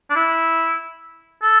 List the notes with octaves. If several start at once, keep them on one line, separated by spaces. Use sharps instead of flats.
D4
E4
A4